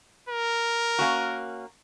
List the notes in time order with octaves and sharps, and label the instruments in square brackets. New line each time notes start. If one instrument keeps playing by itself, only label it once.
[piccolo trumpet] A#4
[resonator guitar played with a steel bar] A#3 C#4 F#4